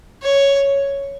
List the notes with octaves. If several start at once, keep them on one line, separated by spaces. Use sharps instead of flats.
C#5